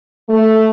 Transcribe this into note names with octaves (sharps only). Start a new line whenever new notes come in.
A3